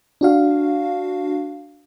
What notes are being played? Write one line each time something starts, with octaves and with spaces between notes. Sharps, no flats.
D4 F#4 F5